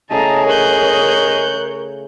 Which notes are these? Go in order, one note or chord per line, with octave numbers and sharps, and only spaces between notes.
C#3 A3 E4 G#4 D#5 A5 A#5
A#4 C#5 F#6 G6